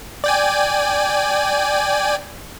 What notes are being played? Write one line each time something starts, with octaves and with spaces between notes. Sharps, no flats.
D5 G5 G#5